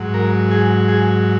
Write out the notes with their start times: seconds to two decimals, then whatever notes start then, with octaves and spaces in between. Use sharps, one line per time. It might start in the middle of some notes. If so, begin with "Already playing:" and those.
Already playing: G#2 F#3
0.14 A#4
0.51 G#4
0.88 G#4